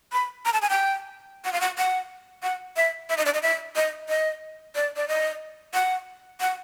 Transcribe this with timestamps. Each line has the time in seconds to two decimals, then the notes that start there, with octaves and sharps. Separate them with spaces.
0.13 B5
0.45 A#5
0.53 A5
0.62 G#5
0.70 G5
1.45 F#5
1.53 F5
1.61 F#5
1.78 F#5
2.43 F#5
2.76 E5
3.09 E5
3.17 D#5
3.26 D5
3.34 D#5
3.42 E5
3.76 D#5
4.09 D#5
4.75 D5
4.96 D5
5.08 D#5
5.74 F#5
6.40 F#5